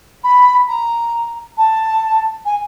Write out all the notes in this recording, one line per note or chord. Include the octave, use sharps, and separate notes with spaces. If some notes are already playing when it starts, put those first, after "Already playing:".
B5
A#5
A5
G#5